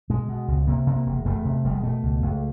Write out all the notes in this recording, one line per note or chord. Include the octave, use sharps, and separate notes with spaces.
B2 G#3
B2
C#2
C3 A#3
C3
A#3
E1
E1 A3
C3
E1 G3
G#3
B2 A3
C#2
C#2